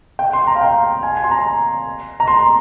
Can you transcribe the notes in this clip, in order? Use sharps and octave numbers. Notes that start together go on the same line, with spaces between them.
G5
C6
A#5
F5
G5
G#5
G#5
C6
A#5
A#5
C6